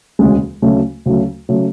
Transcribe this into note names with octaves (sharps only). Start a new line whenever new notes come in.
E1 D2 C#3 G#3
D2 C#3 F#3 A3
D2 C#3 F#3 A3
C#3 F#3 A3